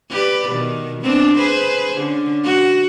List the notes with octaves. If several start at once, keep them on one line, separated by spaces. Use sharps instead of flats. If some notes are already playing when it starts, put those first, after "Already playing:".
G4 B4 D5
B2 D#3
B3 C4 D4
G#4 B4 C5
D3 C#4
F#4